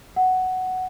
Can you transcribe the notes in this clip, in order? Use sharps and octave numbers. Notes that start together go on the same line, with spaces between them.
F#5